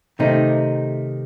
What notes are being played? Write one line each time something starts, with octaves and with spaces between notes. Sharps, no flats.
C3 D#3 A3 D#4